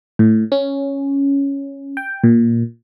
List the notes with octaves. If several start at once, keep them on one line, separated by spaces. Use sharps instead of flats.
A2
C#4
G5
A#2